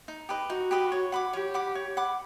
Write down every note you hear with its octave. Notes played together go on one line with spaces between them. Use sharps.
D#4
G4 B4 D#5
D#4 F#4
G4 B4 D#5
C#5
F#5 B5 D6
G4 C#5
F#5 B5 D6
C#5
F#5 B5 D6